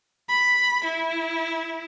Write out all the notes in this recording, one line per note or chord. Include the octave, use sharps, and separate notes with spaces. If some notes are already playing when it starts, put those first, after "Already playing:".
B5
E4